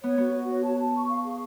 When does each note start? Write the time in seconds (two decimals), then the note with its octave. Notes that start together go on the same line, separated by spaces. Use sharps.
0.03 B3 C#5
0.18 B3 F#4
0.34 F#4
0.49 C#5
0.64 A5
0.79 A5
0.94 C#6
1.09 F5
1.24 G#4